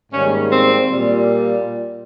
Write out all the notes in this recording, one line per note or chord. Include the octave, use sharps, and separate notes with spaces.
G#2 D#3 G3 A#3 C#4
C4
A#2 G3